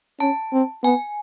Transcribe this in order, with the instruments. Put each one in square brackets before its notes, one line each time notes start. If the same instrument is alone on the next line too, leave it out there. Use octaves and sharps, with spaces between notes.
[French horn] C#4 [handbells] A5
[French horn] C4
[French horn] B3 [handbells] G#5